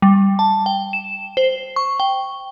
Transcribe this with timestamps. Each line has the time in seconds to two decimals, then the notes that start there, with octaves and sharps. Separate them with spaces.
0.02 G3
0.39 A5
0.66 G5
0.93 E7
1.37 C5
1.76 C#6
2.00 G5